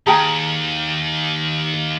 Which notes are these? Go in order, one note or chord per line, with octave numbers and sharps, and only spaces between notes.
D#2 G#4 G5 A5 A#5